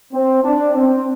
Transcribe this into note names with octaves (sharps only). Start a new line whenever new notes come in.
C4
D4
C4